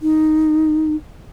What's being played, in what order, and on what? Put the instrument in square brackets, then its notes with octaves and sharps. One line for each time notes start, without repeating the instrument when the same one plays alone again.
[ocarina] D#4